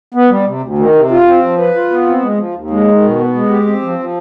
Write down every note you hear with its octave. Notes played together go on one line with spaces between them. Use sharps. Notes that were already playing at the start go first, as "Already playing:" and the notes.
B3
G3
C3
D2
D#3
C3
F4
C4
F3
B4
F4
B3
C4
G#3
F3
D#2
G#3
D#3
B2
B3
G#3
G4
C4
F3
F3